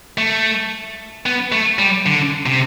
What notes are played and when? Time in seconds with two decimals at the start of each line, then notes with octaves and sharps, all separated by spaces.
0.18 A3
1.26 B3
1.52 A3
1.79 G3
2.06 D3
2.46 C3